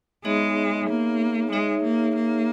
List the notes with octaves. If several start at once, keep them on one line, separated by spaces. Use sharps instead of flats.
G#3 B3 D#4 G#4 C#5 E5
A#3
G#3 D#4 G#4 C#5 E5
A#3
A#3